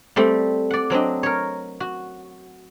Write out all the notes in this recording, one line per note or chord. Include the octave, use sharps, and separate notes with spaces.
G3 A3 C4
D5 F#5
F#3 C4 D4 D#5
A#4 C#5
F#4